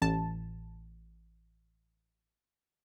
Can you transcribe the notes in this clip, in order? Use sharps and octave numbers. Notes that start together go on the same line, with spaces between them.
A1 A5